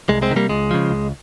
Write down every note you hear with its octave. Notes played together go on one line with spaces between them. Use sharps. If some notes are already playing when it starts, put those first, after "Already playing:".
C2 G#3
G#3 C4
C3 D#3
G3 A#3
C#2 G#3
C#3 F3
C#2